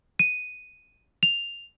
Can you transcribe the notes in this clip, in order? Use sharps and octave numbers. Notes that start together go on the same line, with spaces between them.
D#7
F7